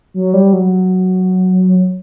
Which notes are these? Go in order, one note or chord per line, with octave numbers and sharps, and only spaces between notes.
F#3
G3
F#3